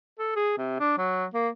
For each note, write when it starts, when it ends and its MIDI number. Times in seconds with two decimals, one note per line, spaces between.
0.19 0.35 69
0.36 0.54 68
0.58 0.75 48
0.80 0.95 62
0.98 1.26 54
1.34 1.49 58